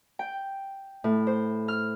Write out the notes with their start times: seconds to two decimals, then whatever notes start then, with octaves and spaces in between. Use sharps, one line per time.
0.19 G5
1.04 A2
1.27 C5
1.68 F6